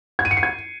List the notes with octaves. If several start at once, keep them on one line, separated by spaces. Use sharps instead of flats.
G#6
D#7
C#7
C7
G#6